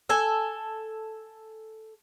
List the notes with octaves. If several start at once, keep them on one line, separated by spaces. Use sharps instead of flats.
A4 G#5